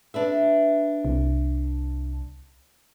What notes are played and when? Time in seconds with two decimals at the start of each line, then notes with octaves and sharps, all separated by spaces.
0.14 D4 B4 E5
1.05 C2